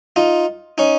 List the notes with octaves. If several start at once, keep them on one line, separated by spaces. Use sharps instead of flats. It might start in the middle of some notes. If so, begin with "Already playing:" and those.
D#4 F4
C#4 D#4